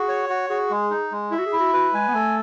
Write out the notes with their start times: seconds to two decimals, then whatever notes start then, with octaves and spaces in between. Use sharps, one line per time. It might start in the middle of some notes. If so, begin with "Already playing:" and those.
Already playing: F#4 G#4
0.08 C#5
0.29 F#4
0.50 F#4 G#4
0.71 G#3
0.91 D#4
1.12 G#3
1.31 E4 E5
1.39 F#4
1.46 G#4
1.53 E4
1.60 F#4
1.73 F#4 B4
1.94 G#3 G#5
2.08 B3
2.14 A3 A4